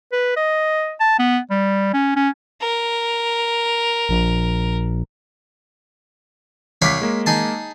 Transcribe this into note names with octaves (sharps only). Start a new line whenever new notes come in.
B4
D#5
A5
B3
G3
C#4
C#4
A#4
A#1
C2 C#5 F5 B5 D6 B6
G#3 A#3
D#4 G#4 A5